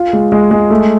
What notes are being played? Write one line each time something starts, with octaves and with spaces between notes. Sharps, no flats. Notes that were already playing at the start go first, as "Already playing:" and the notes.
Already playing: F4
G#3
G#3
G#3
A3